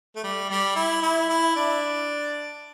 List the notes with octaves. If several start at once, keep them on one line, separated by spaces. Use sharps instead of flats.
A3
G3
G3
E4
E4
E4
D4